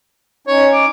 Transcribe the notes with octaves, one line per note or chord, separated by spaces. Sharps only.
C#4 D#4 C#5
D6